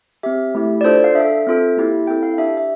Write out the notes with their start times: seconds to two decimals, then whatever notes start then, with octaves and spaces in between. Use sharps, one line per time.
0.23 C4 G4 E5
0.55 A3 E4 G4
0.81 D5
0.84 D4 F4 A4 C5
1.04 F5
1.15 D4 A4 E5
1.47 C4 F4 A4
1.77 A#3 E4 G4
2.07 C4 E4 A4 G5
2.23 F5
2.38 D4 G4 E5
2.57 E5